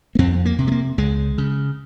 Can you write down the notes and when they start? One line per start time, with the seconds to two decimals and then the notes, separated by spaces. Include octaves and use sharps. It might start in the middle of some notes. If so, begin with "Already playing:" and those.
0.15 A#3
0.19 F2 C4
0.45 A#3
0.59 C3
0.67 G#3
0.72 A#3
0.98 C#2 G#3
1.38 C#3